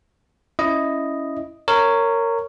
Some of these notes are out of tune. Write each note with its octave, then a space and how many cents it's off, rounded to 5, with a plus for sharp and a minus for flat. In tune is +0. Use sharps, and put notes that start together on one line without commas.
C#4 +10 E4 +0 D#5 +0
A#4 -15 C#5 +5